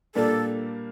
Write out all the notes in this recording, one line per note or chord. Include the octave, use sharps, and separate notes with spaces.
A#2 G3 A#3 D4 A4